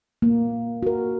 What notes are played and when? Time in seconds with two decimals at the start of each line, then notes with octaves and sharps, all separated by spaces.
0.22 A#3
0.83 F#4 A#4